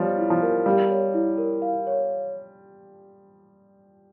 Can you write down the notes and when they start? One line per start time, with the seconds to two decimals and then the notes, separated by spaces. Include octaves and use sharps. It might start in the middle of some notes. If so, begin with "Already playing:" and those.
Already playing: F3 G3 C#5 F5
0.18 E4
0.30 F3
0.42 A#4
0.66 G3 F5
0.90 C#5
1.14 E4
1.38 A#4
1.62 F5
1.87 C#5